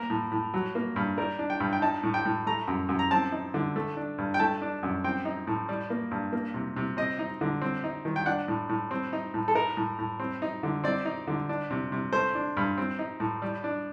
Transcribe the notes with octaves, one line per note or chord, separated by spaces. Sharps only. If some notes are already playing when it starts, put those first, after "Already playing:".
Already playing: A#3 A#4
A2
A2
F#3
A#3
G2
G3 A#4
D4
G5
G2
G5
D#4 A5
A2
G5
A2
A3 A#5
F#2
F#2
A#5
C4 A5
D#4
D3
A3
D4
G2
G5
A3 A5
D4
F#2
C4 G5
D#4
A2
G3
A#3
G2
A#3
C3
C3
C4 D#5
D#4
D3
C4
D#4
D#3
G5
D4 F#5
A2
A2
C4
D#4
A2
A4
D#4 A#4
A2
A2
C4
D#4
D3
C4 D5
D#4
D3
D4
C3
C3
A3 C5
D4
G2
C4
D#4
A2
G3
D4